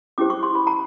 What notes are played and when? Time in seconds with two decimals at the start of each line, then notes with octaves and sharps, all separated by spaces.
0.18 C#4 E4 G4 C5 D6
0.30 C#6
0.43 C6
0.55 B5
0.67 A#5